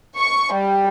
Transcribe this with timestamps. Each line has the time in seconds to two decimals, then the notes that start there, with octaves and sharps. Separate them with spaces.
0.17 C#6
0.53 G3